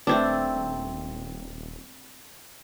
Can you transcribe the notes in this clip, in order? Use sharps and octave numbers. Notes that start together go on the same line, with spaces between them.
D#1 A3 C4 D4